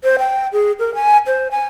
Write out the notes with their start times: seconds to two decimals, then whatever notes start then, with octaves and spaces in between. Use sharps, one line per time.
0.04 C5
0.19 G5
0.53 G#4
0.79 A#4
0.95 G#5
1.27 C5
1.51 G#5